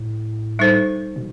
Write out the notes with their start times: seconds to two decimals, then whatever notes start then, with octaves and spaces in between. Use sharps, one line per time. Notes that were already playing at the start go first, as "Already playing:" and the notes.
Already playing: A2
0.59 G3 D#4 A4 C5
1.16 B2